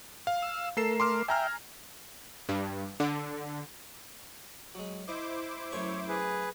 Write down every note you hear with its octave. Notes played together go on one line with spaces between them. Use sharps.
F5
E6
A3 A4 A#4 C7 E7
C6 D6 F6
E5 G5 G#5 A#5 F6
G2
D3
F#3 G#3
E4 C5 D#5 D6
F#2 A3 C#5 C#6
G#4 B4